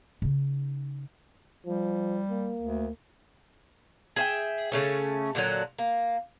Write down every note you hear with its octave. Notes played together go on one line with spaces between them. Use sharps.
C#3 D#4
F3 G3
A#3
D2
G#4 E5 G5
C#3 A3 C#4
A#2 D3 F3 F#3
A#3